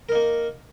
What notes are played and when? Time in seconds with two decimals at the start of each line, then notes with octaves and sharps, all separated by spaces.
0.09 A#4
0.12 D#4
0.15 A#3